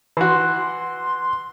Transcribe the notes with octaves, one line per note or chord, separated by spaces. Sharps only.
E3 F#4 C6